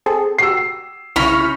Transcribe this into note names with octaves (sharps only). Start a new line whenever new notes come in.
C4 G#4 A4
F#4 G4 E6 C7
C2 C#3 C#4 D#4 E4 B5 C#6 F6